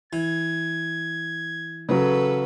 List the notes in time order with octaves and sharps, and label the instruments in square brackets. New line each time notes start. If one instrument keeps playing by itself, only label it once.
[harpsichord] E3 [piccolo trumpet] G#6
[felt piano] C#3 F#3 [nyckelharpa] A4 B4